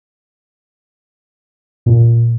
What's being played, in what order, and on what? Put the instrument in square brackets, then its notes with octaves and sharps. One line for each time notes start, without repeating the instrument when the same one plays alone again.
[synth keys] A#2